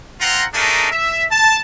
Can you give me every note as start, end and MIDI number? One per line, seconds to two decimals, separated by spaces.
0.20 0.45 60
0.20 0.45 65
0.20 0.45 78
0.20 0.45 82
0.53 0.88 57
0.53 0.88 62
0.53 0.88 63
0.53 0.88 68
0.53 0.88 70
0.91 1.24 76
1.31 1.60 81